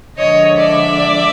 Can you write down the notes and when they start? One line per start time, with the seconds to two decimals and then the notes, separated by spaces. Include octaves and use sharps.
0.18 D3 F3 G#3 C#5 D#5
0.57 D5 E5